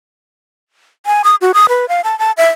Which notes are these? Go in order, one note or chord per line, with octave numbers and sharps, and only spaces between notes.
G#5
D#6
F#4
D#6
B4
F5
A5
A5
E5